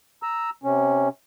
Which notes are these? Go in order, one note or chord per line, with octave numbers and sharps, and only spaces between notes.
A#5 E6
C3 C#4